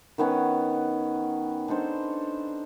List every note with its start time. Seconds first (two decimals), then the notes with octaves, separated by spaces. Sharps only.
0.18 D#3 B3 C#4 F#5
1.68 D4 D#4 A4 C5